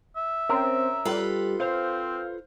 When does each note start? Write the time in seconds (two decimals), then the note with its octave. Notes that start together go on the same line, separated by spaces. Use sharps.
0.16 E5
0.49 C4 C#4 A#4
1.05 G3 F4 A4 B4
1.60 C4 C5 F5